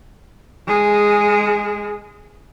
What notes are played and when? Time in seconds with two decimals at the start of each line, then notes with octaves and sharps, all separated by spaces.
0.67 G#3 G#4